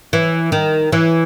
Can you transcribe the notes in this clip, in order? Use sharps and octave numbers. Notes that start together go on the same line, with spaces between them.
E3
D#3
E3